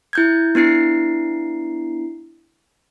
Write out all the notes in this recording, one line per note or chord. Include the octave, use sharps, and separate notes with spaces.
E4 G6 G#6
B3 D4 E4 C7